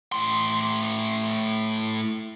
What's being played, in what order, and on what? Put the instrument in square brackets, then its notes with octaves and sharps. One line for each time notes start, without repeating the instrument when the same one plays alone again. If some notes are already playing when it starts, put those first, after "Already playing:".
[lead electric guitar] A2 C6